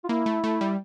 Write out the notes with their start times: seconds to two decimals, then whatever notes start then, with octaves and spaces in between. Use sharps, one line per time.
0.04 F4
0.08 A#3 E4
0.26 A3
0.44 A3
0.61 G3